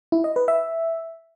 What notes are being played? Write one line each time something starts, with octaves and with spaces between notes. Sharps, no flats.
E4
D#5
B4
E5